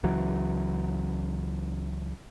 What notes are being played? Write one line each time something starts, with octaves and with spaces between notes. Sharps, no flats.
C#2 E3 F#3